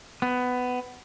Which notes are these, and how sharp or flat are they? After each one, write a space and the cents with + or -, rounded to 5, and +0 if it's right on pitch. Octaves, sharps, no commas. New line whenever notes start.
B3 +15